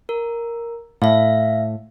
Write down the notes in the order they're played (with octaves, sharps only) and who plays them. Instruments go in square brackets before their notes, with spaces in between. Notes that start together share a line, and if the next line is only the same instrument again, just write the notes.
[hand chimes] A#4
[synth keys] A2 [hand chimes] E5 F5